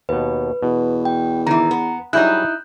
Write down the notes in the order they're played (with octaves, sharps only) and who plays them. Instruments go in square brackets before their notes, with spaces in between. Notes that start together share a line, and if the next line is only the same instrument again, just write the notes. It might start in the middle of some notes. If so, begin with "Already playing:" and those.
[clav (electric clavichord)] D#2 B2 [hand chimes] B4
[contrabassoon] E2 [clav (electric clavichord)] B2
[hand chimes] G5
[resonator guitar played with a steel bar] D#3 E3 [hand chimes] A#5
[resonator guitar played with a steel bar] B3
[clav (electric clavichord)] F#3 G3 G#4 [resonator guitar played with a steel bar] D#4 E4 [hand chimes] F#6 G6